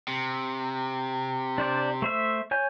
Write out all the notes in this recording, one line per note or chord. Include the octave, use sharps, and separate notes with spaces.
C3
D4 C5 D5
A3 C5 E5
C#5 G#5 G6